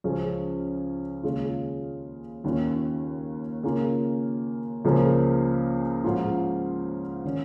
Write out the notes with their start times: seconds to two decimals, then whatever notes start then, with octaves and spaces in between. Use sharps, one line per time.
0.04 C#2 C#3 F3 C#4
1.23 D#2 C#3 G#3 F4
2.44 D#2 D#3 C#4 F4
3.63 C#3 A#3 F4
4.85 C#2 C#3 F3 A#3
6.04 G#2 F3 C#4 F4
7.25 D#3 C#4